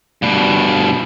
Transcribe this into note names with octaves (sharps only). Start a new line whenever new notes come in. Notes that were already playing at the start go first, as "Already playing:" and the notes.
G2 B2